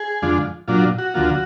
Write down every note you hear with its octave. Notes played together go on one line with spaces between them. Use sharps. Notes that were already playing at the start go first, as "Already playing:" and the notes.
Already playing: G#4
F2 D3 G#3 D4 F4
A#2 F#3 D4 F4
F#4
D2 D3 F3 A#3 F4